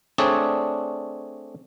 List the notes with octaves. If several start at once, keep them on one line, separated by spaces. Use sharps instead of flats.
A3 C4 D4 G#4 C#5 D5